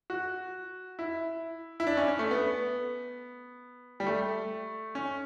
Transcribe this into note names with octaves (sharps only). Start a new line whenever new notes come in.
F#4
E4
E4
D4
C#4
C#4
A3
B3
G3
A3
C#4